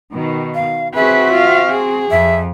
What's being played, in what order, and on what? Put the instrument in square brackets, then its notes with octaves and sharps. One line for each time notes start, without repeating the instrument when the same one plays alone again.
[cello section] B2 D#3
[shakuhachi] F5
[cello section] C4 F#4 [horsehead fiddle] G#4 B4 [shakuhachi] E5
[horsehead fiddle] F4 F5
G#4
[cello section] F2 [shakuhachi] E5